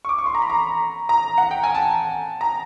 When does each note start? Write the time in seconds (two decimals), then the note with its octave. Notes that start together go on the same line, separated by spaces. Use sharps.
0.05 C#6
0.09 D6
0.18 C#6
0.26 C6
0.35 A#5
0.42 B5
0.50 A#5
1.09 A#5
1.38 F#5
1.51 G5
1.63 G#5
1.75 A5
2.41 A#5